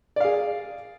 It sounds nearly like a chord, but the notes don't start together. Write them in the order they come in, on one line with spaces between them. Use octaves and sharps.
D5 F5 G#4